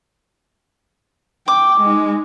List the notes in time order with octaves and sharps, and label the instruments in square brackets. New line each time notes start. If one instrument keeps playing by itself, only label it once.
[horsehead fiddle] G5 [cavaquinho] D6
[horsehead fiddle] G#3 D#4